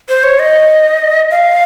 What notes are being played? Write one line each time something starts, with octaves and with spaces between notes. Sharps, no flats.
C5
C#5
D#5
F5